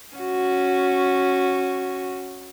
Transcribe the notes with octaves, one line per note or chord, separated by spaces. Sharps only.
C#4 F#4